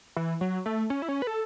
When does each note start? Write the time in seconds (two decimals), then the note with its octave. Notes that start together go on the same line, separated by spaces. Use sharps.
0.17 E3
0.41 F#3
0.66 A3
0.90 C#4
1.02 E4
1.08 C#4
1.22 B4
1.27 A4